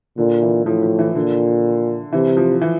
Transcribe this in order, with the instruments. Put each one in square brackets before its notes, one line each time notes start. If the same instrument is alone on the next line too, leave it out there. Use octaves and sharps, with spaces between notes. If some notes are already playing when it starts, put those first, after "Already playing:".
[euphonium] A#2 [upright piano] D3
[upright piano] E3
[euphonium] A2 [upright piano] F3
[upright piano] F3
E3
[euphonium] A#2 [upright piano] D3
[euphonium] C3 [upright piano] E3
[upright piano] F3
E3